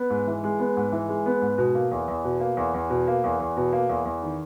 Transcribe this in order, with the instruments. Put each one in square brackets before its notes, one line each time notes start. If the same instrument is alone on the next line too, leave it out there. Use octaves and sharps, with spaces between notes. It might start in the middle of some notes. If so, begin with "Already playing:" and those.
Already playing: [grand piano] B3
G#2
E3
G#3
B3
G#2
E3
G#3
B3
G#2
B2
A#3
E2
E2
B2
A#3
E2
E2
B2
A#3
E2
E2
B2
A#3
E2
E2
D#3